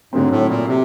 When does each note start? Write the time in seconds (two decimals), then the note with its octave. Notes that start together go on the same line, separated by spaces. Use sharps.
0.12 G#2 D3 F#3 A3 C4
0.31 A2
0.49 A#2
0.68 C3